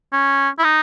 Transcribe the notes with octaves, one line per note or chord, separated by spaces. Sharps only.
C#4
E4
D#4